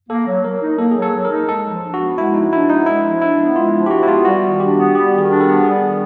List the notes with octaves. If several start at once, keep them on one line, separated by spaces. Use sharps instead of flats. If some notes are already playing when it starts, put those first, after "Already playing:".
A#3 A4
F#3
F#3 A#4
D#4
A#3 A4
F#3 G#4
A4
F#3
A#4
D#4
G#3 A4
F3
D4
F#4
B3
G#3 E4
F3 D#4
D4 E4
B3 D#4
G#3 E4
F3
D4 E4
B3
G#3 F4
F3
G4
D4 F#4
E4
B3 F4
G3 F#4
D#3
D4 G4
B3
G3 G4
D#3
G#4
D4
A4
B3
G3 G#4
D#3